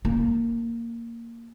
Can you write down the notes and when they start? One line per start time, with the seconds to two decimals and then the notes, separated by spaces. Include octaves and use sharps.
0.05 A#3 C#4